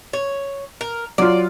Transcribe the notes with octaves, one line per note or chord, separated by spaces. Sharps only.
C#5
A#4
F#3 F4 D5